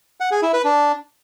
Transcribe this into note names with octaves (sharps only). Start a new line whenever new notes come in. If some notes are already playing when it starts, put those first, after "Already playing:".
F#5
G#4
E4
B4
D4